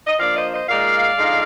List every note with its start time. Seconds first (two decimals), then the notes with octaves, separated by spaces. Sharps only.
0.07 D#5
0.19 F3 A#3 D4 D5 F5
0.35 C5 D#5
0.52 C5 D#5
0.68 A#2 G#3 D#4 D5 F5
1.18 D3 F3 G#3 D#4